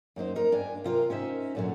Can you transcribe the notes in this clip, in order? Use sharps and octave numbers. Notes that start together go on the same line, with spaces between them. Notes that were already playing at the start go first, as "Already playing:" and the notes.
F#2 A#3 D#4 C5
D#4 A#4
G2 D4 G#5
C3 F4 A#4
C#4 D#4 C5 E5
F#2 A#2 D3 D#3 F#3